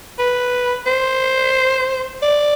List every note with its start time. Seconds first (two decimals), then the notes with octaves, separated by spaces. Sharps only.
0.19 B4
0.86 C5
2.22 D5